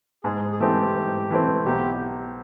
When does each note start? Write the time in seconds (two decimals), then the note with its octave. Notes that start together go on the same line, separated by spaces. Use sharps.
0.24 G#2 G#4
0.52 G#4
0.60 E3 A3 C4 G4
0.95 G#2
1.30 E3 A3 C4
1.65 B1 G4